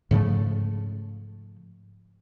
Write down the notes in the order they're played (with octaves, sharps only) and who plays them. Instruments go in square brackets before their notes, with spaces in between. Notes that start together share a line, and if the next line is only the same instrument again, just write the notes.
[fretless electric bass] G#2 C#3 F3 A3